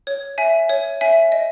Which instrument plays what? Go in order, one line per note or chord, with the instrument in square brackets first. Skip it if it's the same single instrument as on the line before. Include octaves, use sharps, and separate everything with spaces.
[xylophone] C#5
E5 G#5
C#5
E5 G#5
D#5